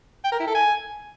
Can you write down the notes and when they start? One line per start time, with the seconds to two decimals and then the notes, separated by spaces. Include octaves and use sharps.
0.24 G5
0.32 A#4
0.40 E4
0.47 A4
0.55 G#5